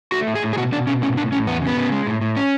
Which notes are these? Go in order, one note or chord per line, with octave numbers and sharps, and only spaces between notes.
A3 F#4
A2
G#4
A2
G#4
B2 F#4
B2 D4
B2 C#4
A2 C#4
A2 D4
A2 C#4
E2 B3
C#3
B3
C#3
G#3
A2
A2
C#4